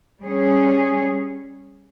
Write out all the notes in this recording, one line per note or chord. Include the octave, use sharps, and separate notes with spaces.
G3 C#4 G#4